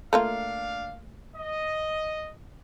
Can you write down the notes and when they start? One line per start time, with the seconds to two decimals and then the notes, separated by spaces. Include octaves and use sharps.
0.13 A3 A#3 D4 F4 F5
1.36 D#5